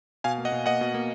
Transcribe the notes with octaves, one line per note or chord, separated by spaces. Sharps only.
B2 F5 G#5
A#3
D#5 F#5
B2
A#3 D#5 F#5
B2
A#3